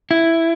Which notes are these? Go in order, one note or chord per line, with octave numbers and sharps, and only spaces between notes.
E4